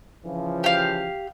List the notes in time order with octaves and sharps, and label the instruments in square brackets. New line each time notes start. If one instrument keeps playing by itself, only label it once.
[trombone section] C#3 E3 F3
[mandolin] G4 F5